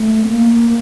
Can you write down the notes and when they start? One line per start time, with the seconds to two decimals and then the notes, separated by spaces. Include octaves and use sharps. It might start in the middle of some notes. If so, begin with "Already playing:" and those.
Already playing: A3
0.24 B3
0.29 A#3